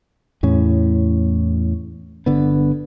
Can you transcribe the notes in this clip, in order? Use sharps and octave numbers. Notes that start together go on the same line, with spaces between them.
E2 A2 C#4
G1 D3 B3